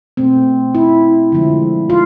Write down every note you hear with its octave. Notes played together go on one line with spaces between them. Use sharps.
B2 A3 C4
E4
D3 F3 G#3
F4